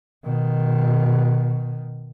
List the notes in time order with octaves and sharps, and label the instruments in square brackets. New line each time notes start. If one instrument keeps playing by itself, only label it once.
[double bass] B2 D#3